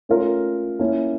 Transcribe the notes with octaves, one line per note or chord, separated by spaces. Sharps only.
A3 C#4 F4 A#4
A#3 C#4 E4